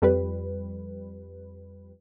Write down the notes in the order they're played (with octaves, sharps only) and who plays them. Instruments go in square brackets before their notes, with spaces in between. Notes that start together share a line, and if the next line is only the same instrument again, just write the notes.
[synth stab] F2 G3 B4